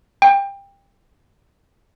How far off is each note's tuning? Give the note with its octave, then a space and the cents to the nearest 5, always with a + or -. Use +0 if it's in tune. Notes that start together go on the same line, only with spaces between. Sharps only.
G5 +20